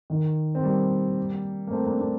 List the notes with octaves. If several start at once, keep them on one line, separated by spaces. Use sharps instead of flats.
D#3
C4
G3 A#3
A#3
A3 C4
A#3 D4
A#3 D4